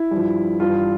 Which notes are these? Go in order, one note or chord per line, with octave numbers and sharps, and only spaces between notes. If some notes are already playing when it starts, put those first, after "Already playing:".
Already playing: E4
G2 F3
G2 E3 F4